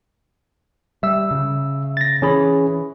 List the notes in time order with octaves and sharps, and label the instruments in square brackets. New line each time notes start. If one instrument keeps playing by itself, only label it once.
[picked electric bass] G3 [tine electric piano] E5 E6
[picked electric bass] C#3
[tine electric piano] A6 A#6
[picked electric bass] E3 [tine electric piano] C#4 G#4 B5